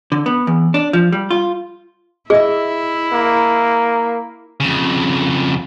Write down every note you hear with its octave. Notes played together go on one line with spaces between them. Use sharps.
D3
B3
E2
D4
F3
G3
F4
E4 G#4 D#5 E5
A#3
F2 C#3